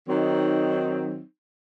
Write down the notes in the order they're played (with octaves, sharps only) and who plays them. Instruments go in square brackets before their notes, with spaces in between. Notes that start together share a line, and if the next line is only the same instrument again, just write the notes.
[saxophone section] D#3 F#3 C4 D#4